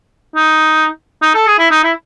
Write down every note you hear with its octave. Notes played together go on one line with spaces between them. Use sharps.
D#4
D#4
A4
G#4
E4
D#4
E4